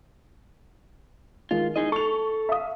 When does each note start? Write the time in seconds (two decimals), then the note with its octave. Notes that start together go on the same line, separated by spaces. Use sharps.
1.51 D#3 G#3 F4
1.76 D#4 E4 G#4 D#5
1.92 A4 C#6 F7
2.49 E5 F5 D#6